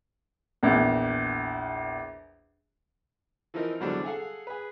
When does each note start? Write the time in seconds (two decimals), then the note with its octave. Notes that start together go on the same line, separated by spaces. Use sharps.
0.63 A#1 E2
3.54 E3 F3 C4 D#4 A#4 D#5
3.80 E2 D3 F#3 G3 C4 D4
4.04 G#4 A4 F5 F#5 G#5
4.47 G#4 B4